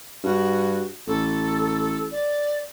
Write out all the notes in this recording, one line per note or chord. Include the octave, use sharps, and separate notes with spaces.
G2 F#4
A1 A4
D5